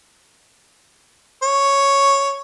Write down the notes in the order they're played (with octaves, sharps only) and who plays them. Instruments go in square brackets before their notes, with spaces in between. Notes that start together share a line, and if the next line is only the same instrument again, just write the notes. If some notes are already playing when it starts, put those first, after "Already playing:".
[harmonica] C#5